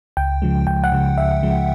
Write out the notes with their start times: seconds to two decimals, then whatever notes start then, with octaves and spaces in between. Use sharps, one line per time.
0.17 C#2 G5
0.42 C#3 F3 G#3
0.67 C#2 G5
0.84 F#5
0.92 C#3 F3 G#3
1.18 C#2 E5
1.43 C#3 F3 G#3